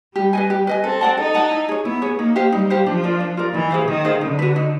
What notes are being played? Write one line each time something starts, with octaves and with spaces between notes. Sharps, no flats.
G3 G4
B4 D#5 G#5
G4
B4 D#5 G#5
C4 A4
D5 F#5 A5
D#4 A4
D5 F#5 A5
E4
G#4 C#5
B3 E4
G#4 C#5
A#3 D#4
G4 C5 F5
G3 D#4
G4 C5 F5
F3 D4
F4 A#4 D5
D4
F4 A#4 D5
E3 D#4
G#4 C5 F5
D#3 D#4
G#4 C5 F5
D3 D#4
F#4 B4
D#4